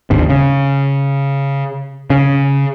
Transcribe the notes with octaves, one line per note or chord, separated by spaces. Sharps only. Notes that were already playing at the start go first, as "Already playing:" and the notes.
D1 G1 D#2 C3
C#3
C#3